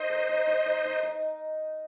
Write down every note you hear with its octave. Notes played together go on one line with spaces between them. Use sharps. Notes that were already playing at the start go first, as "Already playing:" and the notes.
Already playing: D#4 C5 D#5
A#4
D#4
D#4
D#4
D#4
D#4